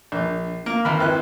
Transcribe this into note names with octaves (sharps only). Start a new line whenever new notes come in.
A#1 D4
A#3
G#1 D#3 A#4 B5
G#1 E4 B4 G5 F#6